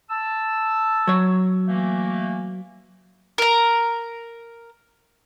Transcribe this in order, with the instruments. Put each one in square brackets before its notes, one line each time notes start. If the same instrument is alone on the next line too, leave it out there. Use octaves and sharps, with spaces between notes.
[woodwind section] A5 E6
[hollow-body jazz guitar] F#3 C#5
[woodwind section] E3 A3 A#3
[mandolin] A#4 A#5